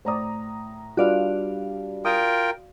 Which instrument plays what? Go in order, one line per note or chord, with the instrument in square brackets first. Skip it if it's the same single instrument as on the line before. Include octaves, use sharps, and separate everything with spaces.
[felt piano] A2 A#5 D#6 [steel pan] C5 D5
[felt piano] G3 D4 [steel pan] F4 B4 D#5 [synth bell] F#4 D5 F5
[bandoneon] F4 A#4 G5 [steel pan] D#6